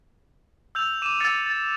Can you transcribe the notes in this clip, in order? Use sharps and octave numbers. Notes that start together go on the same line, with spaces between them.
E6 G6 F7
D6 D#7 E7
E6 A6 C#7
A6